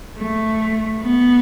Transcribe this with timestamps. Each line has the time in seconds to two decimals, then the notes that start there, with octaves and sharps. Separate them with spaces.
0.19 A3
1.02 B3